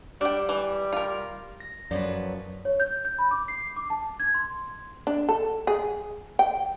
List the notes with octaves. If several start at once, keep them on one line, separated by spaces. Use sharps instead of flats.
G3 D4 G5
E3
F4 A#4
A#6
F#2 F3 F#3 B4 D5
C#5
G6
G6
B5
D6
C7
D6
A5
G#6
C6
D4
A4
G#4
G5